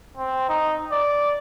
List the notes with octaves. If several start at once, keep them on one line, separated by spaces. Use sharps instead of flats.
C4
D#4
D5